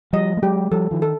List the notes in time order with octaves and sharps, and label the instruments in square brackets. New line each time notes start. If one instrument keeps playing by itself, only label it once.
[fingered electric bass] F3 G3 [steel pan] D#5
[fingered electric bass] A3
[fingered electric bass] F#3 G#3 [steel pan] G4
[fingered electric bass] F3 G3 [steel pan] A4
[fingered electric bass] D#3 F3
[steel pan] A4